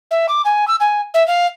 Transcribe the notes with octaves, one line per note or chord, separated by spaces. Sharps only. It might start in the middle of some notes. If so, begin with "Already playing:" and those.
E5
D6
G#5
E6
G#5
E5
F5